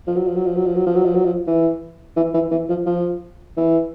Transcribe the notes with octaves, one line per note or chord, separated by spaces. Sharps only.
F3
F#3
F3
F#3
F3
F#3
F3
F#3
F3
F#3
F3
F#3
F3
E3
E3
E3
E3
F3
F3
E3